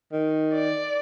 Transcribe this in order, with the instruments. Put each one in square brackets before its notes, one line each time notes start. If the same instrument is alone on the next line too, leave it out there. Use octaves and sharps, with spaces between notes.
[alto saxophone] D#3
[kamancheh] D5